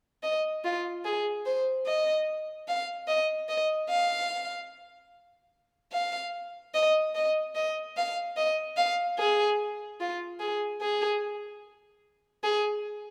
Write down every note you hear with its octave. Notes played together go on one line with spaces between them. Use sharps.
D#5
F4
G#4
C5
D#5
F5
D#5
D#5
F5
F5
D#5
D#5
D#5
F5
D#5
F5
G#4
F4
G#4
G#4
G#4